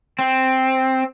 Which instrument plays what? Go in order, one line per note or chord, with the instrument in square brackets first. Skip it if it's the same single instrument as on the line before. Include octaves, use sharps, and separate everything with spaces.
[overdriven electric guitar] C4